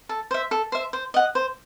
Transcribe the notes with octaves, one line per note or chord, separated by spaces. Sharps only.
A4
C5 E5
A4
C5 E5
C5
D#5 F#5
C5